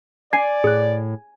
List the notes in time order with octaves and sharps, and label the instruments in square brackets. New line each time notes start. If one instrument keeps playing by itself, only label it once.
[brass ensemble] D5 [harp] G#5 [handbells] G#6 C7
[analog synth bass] A2 [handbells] G#4 F#6